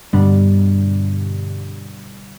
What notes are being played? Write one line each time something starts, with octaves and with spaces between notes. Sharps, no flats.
G2 B2 D3 G3 D4